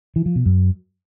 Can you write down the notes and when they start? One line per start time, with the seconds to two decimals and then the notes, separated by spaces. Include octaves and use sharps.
0.16 E3
0.26 F3
0.36 B2
0.46 F#2